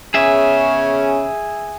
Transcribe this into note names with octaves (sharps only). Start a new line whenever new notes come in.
C#3 B3 C#4 G#4 E5